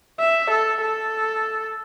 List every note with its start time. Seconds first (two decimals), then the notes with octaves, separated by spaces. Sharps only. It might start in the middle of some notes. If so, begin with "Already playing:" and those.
0.20 E5
0.50 A4
0.81 A4